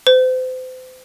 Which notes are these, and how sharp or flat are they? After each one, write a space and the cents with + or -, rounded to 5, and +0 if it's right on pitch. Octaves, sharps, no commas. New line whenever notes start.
C5 -35